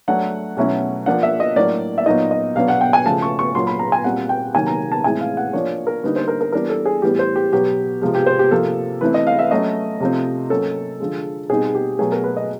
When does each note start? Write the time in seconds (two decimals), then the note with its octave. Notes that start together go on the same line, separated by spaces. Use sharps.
0.08 F#3 A3 D4 F#5
0.57 B2 F#3 A3 C#4 E4
1.06 F3 A#3 D4 F#5
1.23 E5
1.40 D#5
1.56 A2 F#3 A#3 D4 D5
1.98 E5
2.06 A#2 F#3 B3 D#4 D#5
2.31 D#5
2.56 B2 F#3 B3 D4 F5
2.68 F#5
2.81 G5
2.93 G#5
3.06 C#3 F3 A3 A5
3.22 C#6
3.39 C#6
3.55 A#2 F#3 A#3 C6
3.67 B5
3.79 A#5
3.92 G#5
4.04 A#2 G3 C4 F#5
4.29 G5
4.55 C3 D#3 F#3 A#3 G#5
4.67 A#5
4.92 A5
5.04 A2 E3 G#3 C4 E4 G#5
5.21 F5
5.37 F#5
5.53 F3 A#3 D4 C#5
5.87 A#4
6.04 D3 G3 A#3 D#4 B4
6.16 C5
6.28 A#4
6.41 A#4
6.52 E3 G3 B3 D4 A#4
6.70 A4
6.86 G#4
7.02 A2 E3 G3 B3 G4
7.19 C5
7.36 G4
7.52 B2 F#3 B3 G4
8.01 C3 F3 G#3
8.15 G4
8.26 C5
8.39 G4
8.51 C3 F3 A#3 A4
9.01 E3 A3 C4 E4 B4
9.14 D#5
9.27 F5
9.39 E5
9.51 F#3 A3 C#4 D#5
10.00 C3 F3 A3 C4
10.50 F#3 A#3 C#4 A4
11.00 D3 F3 G#3
11.50 B2 G3 C4 D#4 G#4
11.75 G4
11.99 B2 F#3 A3 G#4
12.12 A#4
12.24 B4
12.37 D#5